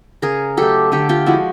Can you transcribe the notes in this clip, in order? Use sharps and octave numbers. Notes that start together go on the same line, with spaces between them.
C#3 G#4 A#4
F#3 A3 G4 A4
D3 G4 A4
F4 G4
F3 G#3 E4 F#4